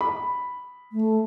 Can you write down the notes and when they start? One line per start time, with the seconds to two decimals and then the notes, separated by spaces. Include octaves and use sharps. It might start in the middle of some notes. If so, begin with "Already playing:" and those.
0.01 B5
0.92 A3